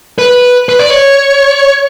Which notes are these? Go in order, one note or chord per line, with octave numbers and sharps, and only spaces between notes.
B4
B4
D5
C#5